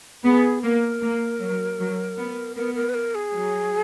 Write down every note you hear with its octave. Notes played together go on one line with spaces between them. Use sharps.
B3 G#4
A#3 A#4
A#3
F#3
F#3
B3
B3 A#4
A#4
B4
A#4
G#4
F#3